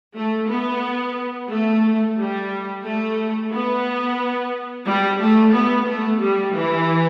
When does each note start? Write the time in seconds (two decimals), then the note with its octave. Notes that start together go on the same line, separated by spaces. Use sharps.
0.15 A3
0.49 B3
1.50 A3
2.17 G3
2.84 A3
3.52 B3
4.86 G3
5.21 A3
5.54 B3
5.87 A3
6.21 G3
6.54 E3